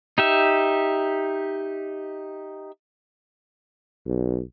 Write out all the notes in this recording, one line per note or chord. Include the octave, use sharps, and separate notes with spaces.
D#4 G4 E5
B1